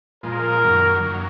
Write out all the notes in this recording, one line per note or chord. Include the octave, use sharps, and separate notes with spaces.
A#2 F3 G#3 A#4
F#2 D#3 F#3 A#3
F#2 D#3 F#3 A#3